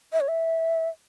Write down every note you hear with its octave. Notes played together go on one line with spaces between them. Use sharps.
E5
C#5
E5